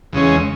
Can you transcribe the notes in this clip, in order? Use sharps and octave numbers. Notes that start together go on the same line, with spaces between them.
E2 C#3 G#3 C#4